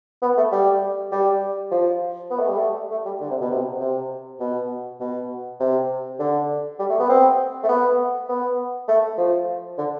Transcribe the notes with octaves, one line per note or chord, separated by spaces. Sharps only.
B3
A3
G3
G3
F3
B3
A3
G3
A3
A3
G3
D3
C3
B2
C3
C3
B2
B2
C3
D3
G3
A3
B3
C4
A3
B3
B3
A3
F3
D3